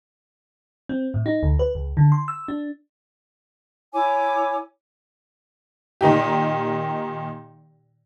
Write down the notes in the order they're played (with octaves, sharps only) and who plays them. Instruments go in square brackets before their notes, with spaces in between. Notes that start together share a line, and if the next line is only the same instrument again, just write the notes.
[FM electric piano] C4
A2
D#4
D2
B4
C#2
D3
C6
E6
D4
[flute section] E4 C#5 G#5 D6
[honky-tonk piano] A#2 D#3 D#4 G4